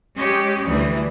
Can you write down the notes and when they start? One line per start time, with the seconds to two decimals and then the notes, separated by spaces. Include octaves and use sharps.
0.15 G#3 C#4 G4
0.65 D2 E3 G3